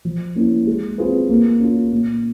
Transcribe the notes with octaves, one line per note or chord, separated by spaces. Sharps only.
F3
A#3 C#4 E4
G#3
C4 F4 G#4 B4
A#3
C#4 F4
A#2